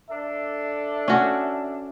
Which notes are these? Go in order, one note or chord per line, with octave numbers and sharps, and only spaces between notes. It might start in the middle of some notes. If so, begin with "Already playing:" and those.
D4 A4 E5
C#4 F#4